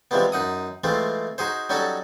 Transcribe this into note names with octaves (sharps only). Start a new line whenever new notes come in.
C3 E3 F3 G3 G#3 B3
F#2 D#4 F#5 D#6
E3 G#3 A3 C4 F4
D#4 F#4 G#4 C5
F#3 G3 C#4 D#4 F#4 A4